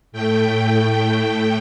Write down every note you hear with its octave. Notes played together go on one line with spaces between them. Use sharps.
A2 A3 G5